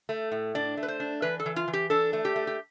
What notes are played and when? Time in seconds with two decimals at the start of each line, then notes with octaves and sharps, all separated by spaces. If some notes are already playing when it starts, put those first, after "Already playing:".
0.09 A3
0.32 A2
0.55 D4 D5
0.77 A3
0.83 B4
0.88 C5
1.00 D4
1.22 E3 B4
1.40 A4
1.46 E3
1.56 F4
1.68 E3
1.73 G4
1.90 D4 A4
2.13 A3
2.25 G4
2.36 A3
2.47 G4